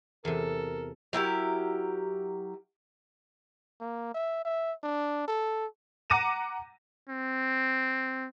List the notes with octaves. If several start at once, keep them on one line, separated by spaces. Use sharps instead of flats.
E2 C3 A4 A#4
F#3 E4 G4 A#4
A#3
E5
E5
D4
A4
F#5 A#5 D6 A#6 D#7 E7
C4